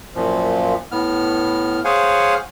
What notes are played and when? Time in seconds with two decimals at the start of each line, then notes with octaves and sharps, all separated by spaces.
0.15 F#2 A#2 F3
0.92 A2 B3 F6
1.85 G#4 C5 C#5 F5 F#5 G#5